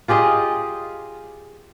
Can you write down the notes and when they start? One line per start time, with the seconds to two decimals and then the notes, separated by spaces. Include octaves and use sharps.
0.08 F4 G4 G#4 D#5